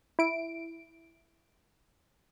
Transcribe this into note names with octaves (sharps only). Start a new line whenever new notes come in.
E4 D7